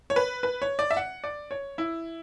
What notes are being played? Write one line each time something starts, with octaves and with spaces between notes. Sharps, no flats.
C#5
B4
B4
C#5
D5
E5
F#5
D5
C#5
E4